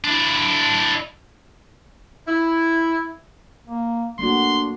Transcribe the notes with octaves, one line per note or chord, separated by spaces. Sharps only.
D4 E4
E4
A#3
A3 A#3 D4 F#4 C6